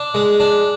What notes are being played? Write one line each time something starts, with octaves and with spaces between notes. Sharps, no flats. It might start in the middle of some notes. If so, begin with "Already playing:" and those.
Already playing: D4
G#3
D4